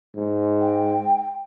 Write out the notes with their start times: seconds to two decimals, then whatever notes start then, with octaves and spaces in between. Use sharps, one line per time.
0.16 G#2
0.61 G5